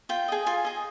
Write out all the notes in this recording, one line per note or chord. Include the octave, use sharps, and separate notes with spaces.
F4 G5
G#4 D#5
F4 G#5
G#4 D#5